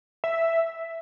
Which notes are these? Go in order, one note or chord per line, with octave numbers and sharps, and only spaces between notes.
E5